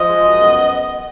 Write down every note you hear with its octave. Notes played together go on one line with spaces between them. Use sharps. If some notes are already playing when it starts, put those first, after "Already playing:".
Already playing: F3 D#5
G#3
F#2
B3